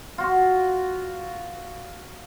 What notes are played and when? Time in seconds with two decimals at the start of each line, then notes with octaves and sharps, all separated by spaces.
0.18 F4 F#4